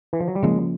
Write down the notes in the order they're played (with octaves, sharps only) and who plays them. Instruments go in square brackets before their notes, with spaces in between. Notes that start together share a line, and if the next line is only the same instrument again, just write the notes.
[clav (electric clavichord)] E3
F3
F#3
G3
[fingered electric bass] C#3 F3 A#3 C#4 [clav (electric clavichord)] G#3